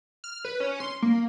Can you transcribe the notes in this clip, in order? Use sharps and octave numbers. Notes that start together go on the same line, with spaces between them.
F6
B4
C#4
C6
A#3